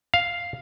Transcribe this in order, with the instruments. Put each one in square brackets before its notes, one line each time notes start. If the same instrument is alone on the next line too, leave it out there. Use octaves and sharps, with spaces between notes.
[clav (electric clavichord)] F5